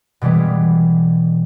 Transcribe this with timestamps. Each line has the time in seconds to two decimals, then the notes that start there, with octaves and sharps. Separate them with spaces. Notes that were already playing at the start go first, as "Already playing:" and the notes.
0.21 B2 E3 G3 G#3 B3